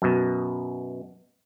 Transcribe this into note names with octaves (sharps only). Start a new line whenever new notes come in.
F#2 B2